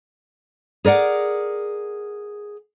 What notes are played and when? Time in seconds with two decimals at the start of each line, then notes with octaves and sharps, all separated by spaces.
0.85 G#4 A#4 D5 F#5